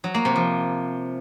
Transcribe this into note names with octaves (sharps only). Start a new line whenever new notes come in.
F#3
A#3
C3
F3